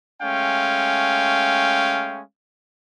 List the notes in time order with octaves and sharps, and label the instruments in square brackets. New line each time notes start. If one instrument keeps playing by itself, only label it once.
[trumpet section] G#3 A3 C#4 F5 G5